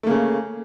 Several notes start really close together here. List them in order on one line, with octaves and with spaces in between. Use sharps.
A3 A#3 C#3